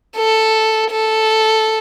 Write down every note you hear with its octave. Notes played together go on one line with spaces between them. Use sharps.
A4
A4